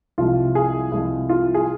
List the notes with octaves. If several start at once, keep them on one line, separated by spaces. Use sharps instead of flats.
C2 C3 F3 G#3 F4
G#4
C2 C3 F3 G#3
F4
G#4